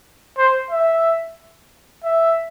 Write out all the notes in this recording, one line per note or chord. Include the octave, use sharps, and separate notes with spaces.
C5
E5
E5